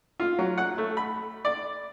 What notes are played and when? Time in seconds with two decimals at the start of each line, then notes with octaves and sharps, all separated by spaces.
0.20 F4
0.39 F#3
0.58 F#5
0.78 A3
0.97 B5
1.45 D5